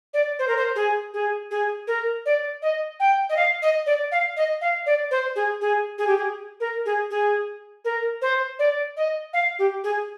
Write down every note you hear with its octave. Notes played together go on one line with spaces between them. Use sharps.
D5
C5
A#4
C5
G#4
G#4
G#4
A#4
D5
D#5
G5
D#5
F5
D#5
D5
F5
D#5
F5
D5
C5
G#4
G#4
G#4
G4
G#4
A#4
G#4
G#4
A#4
C5
D5
D#5
F5
G4
G#4